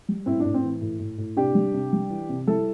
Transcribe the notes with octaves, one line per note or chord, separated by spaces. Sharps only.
G3
A2 C4 E4
A2 D4
C4
E3
A2
A2
A2
C3 D4 G4
G3
C3
G3
E3
C3
G3 E4 A4